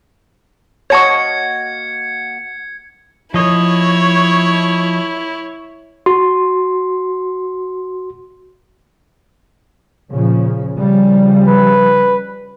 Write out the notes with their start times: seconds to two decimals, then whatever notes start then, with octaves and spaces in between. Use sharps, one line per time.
0.90 A#3 F#4 C#5 D#5 A5 C#6 G#6 C#7
3.34 F3 E4 C#5 D#5
6.06 F#4 C6
10.11 A#2 C#3 F3
10.76 C#3 F3 G3
11.48 B4